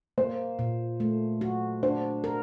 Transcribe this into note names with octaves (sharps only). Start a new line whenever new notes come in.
A#3 C5
A#2
A3
F#4
D4 C5
A#4